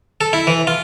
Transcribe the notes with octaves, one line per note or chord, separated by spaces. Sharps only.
A4
E4
E3
F4